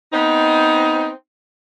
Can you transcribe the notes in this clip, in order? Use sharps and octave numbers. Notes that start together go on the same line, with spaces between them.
B3 C4 D#4